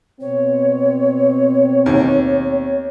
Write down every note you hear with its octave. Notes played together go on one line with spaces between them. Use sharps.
B2 C4 C#5
D#2